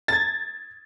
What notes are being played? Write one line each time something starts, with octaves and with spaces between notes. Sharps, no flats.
G#6 A6